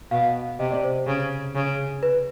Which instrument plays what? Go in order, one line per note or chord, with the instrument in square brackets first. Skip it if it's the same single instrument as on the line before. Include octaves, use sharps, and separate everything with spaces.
[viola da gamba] B2 [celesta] F5
[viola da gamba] C3 [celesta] D#5
[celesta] D5
C5
C5
[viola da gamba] C#3
C#3
[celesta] B4